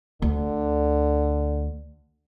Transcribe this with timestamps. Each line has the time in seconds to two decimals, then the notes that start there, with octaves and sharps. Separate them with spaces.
0.22 D2 D3